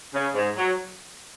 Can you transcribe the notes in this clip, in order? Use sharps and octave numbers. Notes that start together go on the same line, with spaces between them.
C#3
G#2
F#3